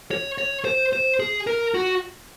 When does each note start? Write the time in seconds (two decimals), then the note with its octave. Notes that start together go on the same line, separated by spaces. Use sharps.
0.11 C#5
0.38 C#5
0.65 C5
0.93 C5
1.20 G#4
1.47 A#4
1.74 F#4